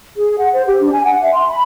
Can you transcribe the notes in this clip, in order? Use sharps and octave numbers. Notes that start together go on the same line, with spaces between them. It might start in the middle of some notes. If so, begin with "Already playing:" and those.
G#4
F#5
C5
G4
D4
G#5
F#5
E5
C6
B5